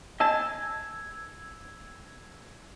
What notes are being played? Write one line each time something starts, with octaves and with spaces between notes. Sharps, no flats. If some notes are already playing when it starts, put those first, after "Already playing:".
D#5 G#5 A5 E6 G#6